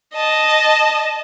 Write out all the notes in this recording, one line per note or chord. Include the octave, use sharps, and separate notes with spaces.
D#5 A5